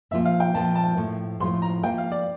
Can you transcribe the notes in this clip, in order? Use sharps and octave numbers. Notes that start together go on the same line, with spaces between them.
A#2 F3 A#3 F4 E5
F5
G5
A#2 F3 A#3 F4 A5
A5
A2 F3 A3
A2 F3 A3 C6
A#5
F3 A#3 F4 G5
F5
D5